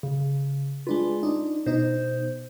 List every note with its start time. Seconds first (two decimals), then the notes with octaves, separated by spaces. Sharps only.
0.03 C#3
0.87 G#3 D4 F4 B4
1.23 D4 D#4
1.66 B2 D#4 C5